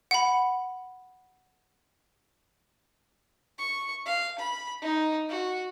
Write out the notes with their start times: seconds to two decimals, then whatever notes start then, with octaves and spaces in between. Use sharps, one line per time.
0.11 F#5 B5
3.58 C#6
4.06 F5
4.39 B5
4.82 D#4
5.29 F#4